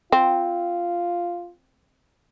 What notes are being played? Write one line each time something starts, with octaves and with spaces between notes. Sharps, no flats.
C4 F4